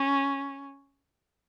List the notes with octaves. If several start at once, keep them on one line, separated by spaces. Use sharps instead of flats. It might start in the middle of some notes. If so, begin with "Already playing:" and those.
Already playing: C#4